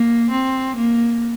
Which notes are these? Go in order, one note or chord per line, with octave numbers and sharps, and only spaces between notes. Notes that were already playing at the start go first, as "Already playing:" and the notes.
Already playing: A#3
C4
A#3